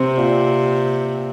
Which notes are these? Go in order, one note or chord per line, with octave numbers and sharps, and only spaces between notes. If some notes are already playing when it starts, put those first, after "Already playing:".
Already playing: C3 C4
A#2